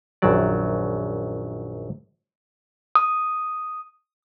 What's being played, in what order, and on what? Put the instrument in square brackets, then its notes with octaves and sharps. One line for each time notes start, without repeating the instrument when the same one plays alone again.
[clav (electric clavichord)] A#1 F#2 D#3 F#3 D5
[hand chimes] D#6